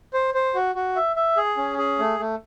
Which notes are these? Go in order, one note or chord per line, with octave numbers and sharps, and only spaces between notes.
C5
C5
F#4
F#4
E5
E5
G#4
C#4
G#4
A3
A3